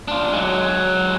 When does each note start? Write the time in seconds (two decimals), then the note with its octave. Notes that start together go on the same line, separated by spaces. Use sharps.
0.08 D4 F4
0.32 F#3 G#3